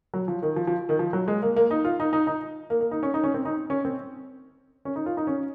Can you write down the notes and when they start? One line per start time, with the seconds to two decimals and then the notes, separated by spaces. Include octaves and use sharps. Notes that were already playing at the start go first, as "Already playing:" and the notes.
0.14 F#3
0.28 F3
0.42 D#3
0.56 F3
0.67 F3
0.89 D#3
0.99 F3
1.13 F#3
1.28 G#3
1.43 A#3
1.56 A#3
1.71 D#4
1.85 F4
2.00 D#4
2.13 D#4
2.27 D#4
2.70 A#3
2.81 A#3
2.91 D#4
3.03 C#4
3.14 D#4
3.24 C#4
3.34 C4
3.45 D#4
3.70 C#4
3.85 C4
4.85 C#4
4.96 D#4
5.06 F4
5.17 D#4
5.27 C#4